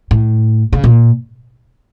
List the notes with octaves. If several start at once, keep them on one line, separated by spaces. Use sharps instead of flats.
A2
C#3
A#2